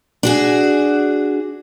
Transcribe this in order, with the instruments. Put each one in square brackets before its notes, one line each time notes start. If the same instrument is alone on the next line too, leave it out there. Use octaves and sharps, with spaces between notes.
[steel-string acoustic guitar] D4 F#4 G#4